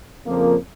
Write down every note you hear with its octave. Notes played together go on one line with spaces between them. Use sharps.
F2 C#3 F3 A#3